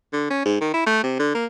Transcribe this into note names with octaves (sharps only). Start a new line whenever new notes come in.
D3
C#4
G#2
D#3
E4
A3
C3
D3
A#3